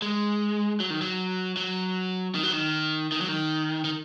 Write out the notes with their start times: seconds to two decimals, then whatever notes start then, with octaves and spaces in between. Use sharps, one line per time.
0.02 G#3
0.80 F#3
0.90 D#3
1.02 F#3
1.57 F#3
2.35 D#3
2.43 F#3
2.53 D#3
3.12 D#3
3.21 F#3
3.28 D#3
3.85 D#3